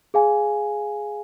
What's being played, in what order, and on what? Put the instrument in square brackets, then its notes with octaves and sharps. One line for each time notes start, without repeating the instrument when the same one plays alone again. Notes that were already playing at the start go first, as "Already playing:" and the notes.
[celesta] G#4 F5 G#5